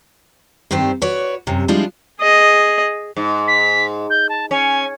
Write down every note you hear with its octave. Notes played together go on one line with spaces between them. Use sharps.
G2 D#3 C4 G4 C5
F#4 B4 C#5 D5
F#2 C3
F3 G3 G#3 D4 E4 F4
G#4 D#5
G#2
B6
G6
A5
C#4 G#5